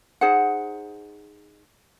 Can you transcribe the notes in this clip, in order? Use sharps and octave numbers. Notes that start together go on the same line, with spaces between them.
D#4 G#4 C5 F#5